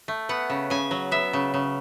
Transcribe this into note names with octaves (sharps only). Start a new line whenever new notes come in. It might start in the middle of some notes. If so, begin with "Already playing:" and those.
A3
B3 F#5
C#3
C#3 G#5
F#3
B3 E5
C#3
C#3